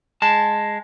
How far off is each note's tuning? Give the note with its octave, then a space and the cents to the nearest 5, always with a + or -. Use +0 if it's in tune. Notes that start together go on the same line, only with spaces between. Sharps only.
G#3 +0 A5 +0